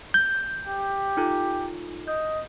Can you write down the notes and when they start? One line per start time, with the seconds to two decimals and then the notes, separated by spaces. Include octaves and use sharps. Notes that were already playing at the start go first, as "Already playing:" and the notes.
0.14 G6
0.67 G4
1.17 D#4 F4 A4
2.08 D#5 G6